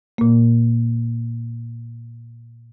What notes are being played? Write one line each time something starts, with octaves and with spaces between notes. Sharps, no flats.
A#2 A#3